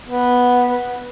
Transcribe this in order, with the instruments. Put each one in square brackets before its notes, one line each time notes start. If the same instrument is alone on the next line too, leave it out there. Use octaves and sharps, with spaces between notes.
[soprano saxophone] B3